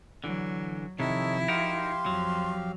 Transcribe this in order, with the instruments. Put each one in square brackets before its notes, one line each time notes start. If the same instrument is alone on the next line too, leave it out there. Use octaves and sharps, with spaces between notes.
[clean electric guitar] D3 E3 [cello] F#3
[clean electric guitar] C3 D#3 [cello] F3 E4 [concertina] D#4 A4 C#5
[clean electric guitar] D#4 F#4 A#4 [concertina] G4 F5 [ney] C6
[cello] F2 F3 [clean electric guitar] F#3